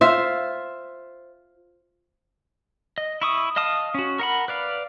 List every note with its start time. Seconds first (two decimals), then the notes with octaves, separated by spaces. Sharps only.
0.01 F4 C5 E5
2.98 D#5
3.22 E4 C#6 D#6
3.56 D#5 F5 A5 D#6
3.94 C#4 F#4
4.19 A#4 F#5 B5
4.48 B4 D5 F5